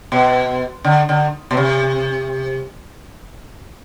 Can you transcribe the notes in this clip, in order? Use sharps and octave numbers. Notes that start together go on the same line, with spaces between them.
B2
D3
D3
B2
C3